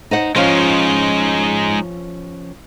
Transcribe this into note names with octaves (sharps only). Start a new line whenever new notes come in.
D#4 C5 F#5
F3 G#3 C#4 D#4 F4